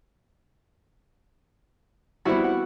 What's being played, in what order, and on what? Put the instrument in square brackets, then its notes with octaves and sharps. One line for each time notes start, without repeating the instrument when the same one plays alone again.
[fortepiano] G3 C4 E4 [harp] B3 F#4
[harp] F#5